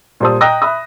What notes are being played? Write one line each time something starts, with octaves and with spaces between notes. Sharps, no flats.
A#2 G3 C5 A5 D#6
D#5 G5 A#5 D#6 F#6 A#6
E5 B5 D#6